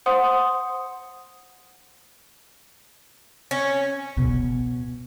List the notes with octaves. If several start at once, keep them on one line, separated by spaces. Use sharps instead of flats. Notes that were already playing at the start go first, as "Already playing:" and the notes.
C5 F#5 C6 D#6
C#4
B2